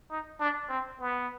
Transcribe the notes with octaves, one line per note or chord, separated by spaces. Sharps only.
D#4
D4
C4
B3